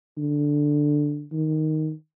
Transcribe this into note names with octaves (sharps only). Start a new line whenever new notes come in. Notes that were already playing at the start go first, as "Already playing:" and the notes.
D3
D#3